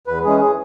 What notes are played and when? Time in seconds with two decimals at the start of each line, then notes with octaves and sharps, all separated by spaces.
0.07 E2 B4
0.24 E3 G#3 C#4 G#4
0.40 G#4